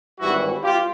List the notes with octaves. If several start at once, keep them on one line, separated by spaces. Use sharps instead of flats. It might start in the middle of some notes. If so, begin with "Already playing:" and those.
G#1 G2 E3 G3 E4 F#4
F4 G4